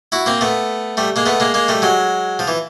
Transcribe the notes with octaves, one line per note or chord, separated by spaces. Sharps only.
E4 F#4
A#3 C4
A3 B3
G3 A3
G#3 A#3
A3 B3
G#3 A#3
G#3 A#3
G3 A3
F#3 G#3
F3
E3